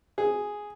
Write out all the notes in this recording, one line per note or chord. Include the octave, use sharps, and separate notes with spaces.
G#4